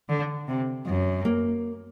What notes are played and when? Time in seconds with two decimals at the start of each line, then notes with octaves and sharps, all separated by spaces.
0.09 D3
0.48 C3
0.86 F#2
1.25 A#3